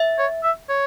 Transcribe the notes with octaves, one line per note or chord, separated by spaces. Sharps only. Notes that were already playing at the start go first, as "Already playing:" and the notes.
Already playing: E5
C#5
E5
C#5